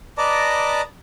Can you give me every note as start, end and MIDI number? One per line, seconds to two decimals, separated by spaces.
0.18 0.81 71
0.18 0.81 74
0.18 0.81 75
0.18 0.81 81
0.18 0.81 82
0.18 0.81 86